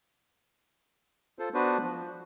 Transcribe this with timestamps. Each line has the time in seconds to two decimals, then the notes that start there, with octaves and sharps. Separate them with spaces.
1.39 F4 A4 C5
1.54 B3 D4 F#4 B4 C5
1.82 F3